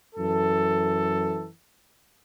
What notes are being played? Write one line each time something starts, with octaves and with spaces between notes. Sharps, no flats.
F#2 E3 A4